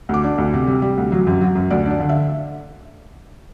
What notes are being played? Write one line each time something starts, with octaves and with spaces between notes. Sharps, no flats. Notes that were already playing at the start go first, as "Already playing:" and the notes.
D2 D6
D4
D2
C3
G3
G3
D2
F#3
F#2
F#3
F#2
D2 D5
D4 D5
D3
E5